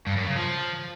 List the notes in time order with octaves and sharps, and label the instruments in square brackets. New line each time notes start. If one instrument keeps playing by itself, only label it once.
[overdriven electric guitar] G2
F#2
C#3
F3